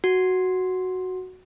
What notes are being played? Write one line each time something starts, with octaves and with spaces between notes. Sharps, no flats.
F#4